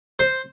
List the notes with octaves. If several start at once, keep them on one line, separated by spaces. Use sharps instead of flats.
C5